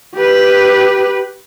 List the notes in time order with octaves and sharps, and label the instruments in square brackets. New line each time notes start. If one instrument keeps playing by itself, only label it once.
[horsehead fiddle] G4 B4